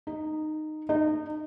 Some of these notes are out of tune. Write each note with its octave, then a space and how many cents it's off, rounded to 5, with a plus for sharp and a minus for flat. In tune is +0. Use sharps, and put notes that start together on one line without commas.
D#4 -10
D#4 -25